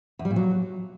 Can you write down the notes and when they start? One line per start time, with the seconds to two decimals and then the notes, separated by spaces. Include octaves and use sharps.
0.19 E2
0.25 G3
0.31 A#2
0.36 F#3